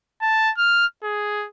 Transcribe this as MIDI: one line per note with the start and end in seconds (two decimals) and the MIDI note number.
0.22 0.51 81
0.58 0.86 89
1.03 1.47 68